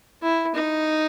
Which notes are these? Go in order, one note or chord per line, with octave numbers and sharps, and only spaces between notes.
E4
D#4